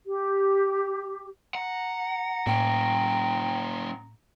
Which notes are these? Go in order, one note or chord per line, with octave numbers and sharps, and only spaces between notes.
G4
F#5 A#5
A2 A#3 C#4 G5